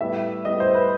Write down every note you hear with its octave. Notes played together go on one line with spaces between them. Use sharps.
A2 G3 B3 E5
A2 G3 B3 D#5
C5
B4